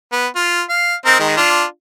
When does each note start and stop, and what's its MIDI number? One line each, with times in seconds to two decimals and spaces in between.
0.12 0.27 59
0.36 0.62 65
0.69 0.95 77
1.06 1.19 60
1.06 1.19 63
1.06 1.19 70
1.19 1.36 51
1.19 1.36 56
1.37 1.64 62
1.37 1.64 65